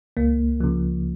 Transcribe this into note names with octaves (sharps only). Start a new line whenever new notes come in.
C#2 A#3
C#3 F3